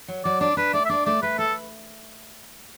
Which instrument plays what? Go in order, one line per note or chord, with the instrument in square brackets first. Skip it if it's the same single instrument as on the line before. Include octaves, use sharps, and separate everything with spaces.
[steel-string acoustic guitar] F#3
[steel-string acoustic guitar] F#3 [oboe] D5
[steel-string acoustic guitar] D4 [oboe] D5
[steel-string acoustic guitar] D4 [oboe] B4
[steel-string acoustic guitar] A3 [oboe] D5
[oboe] E5
[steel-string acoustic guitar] D4 [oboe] D5
[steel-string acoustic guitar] A3 [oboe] D5
[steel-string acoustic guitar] A3 [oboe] B4
[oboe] A4 [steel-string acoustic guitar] B4